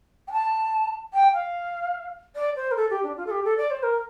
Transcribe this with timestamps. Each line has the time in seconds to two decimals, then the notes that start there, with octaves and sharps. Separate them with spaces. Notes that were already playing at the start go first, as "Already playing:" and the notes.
0.28 G5
0.32 A5
1.14 G5
1.33 F5
2.35 D5
2.56 C5
2.71 A#4
2.76 A4
2.90 G4
3.03 D4
3.17 F4
3.26 A4
3.31 G4
3.45 A4
3.57 D5
3.70 C5
3.83 A#4